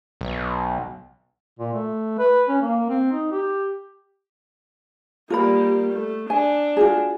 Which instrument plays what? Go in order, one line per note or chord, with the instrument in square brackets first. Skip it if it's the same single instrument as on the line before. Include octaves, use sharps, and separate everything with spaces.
[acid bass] B1
[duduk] A#2
A3
B4
C#4
A#3
C4
D#4
G4
[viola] G3 A#3 [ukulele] F4 A#4 B5
[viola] A3
[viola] D4 [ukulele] G#5
[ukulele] F4 F#4 G#4